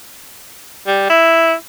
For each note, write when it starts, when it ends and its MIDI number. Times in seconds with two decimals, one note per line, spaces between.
0.87 1.06 55
1.10 1.54 64